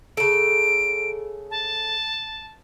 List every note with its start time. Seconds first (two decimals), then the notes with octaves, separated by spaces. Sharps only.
0.17 C#3 A4 D7
1.50 A5